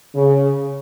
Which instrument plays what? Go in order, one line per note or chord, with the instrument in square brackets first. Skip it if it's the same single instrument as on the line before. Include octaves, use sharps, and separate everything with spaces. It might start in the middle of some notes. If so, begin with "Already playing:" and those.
[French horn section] C#3